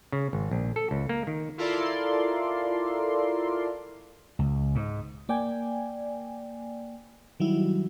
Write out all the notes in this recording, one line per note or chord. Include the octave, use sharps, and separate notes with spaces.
C#3
G#1
A#1
A4
C#2
A#3
D#3
E4 F4 A4 A#4 D5 C6
C#2
G#2
A#3 D5 G5 G#5
D#3 F#3 G3 E4